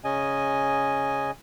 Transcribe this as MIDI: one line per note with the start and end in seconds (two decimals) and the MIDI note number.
0.04 1.31 49
0.04 1.31 61
0.04 1.31 75
0.04 1.31 80